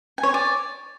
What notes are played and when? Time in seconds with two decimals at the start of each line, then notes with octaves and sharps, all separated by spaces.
0.18 G#5
0.23 C#5
0.29 G#5
0.34 D5